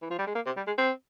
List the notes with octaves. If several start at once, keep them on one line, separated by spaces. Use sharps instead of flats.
E3
F3
G3
G#3
A#3
C3
G3
G#3
C4